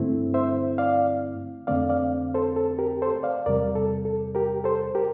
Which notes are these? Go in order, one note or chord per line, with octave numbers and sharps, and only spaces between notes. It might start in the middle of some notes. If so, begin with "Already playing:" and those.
Already playing: G2 D3 A3 C4 E4
C5 E5
D5 F5
F2 D3 A3 C4 D5 F5
D5 F5
A4 C5
A4
G4 A#4
A4 C5
D5 F5
E2 C3 G3 A#4 D5
A4
A4
G4 A#4
A4 C5
G4 A#4